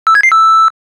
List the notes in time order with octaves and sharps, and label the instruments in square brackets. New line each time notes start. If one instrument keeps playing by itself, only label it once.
[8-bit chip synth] E6
G#6
C7
E6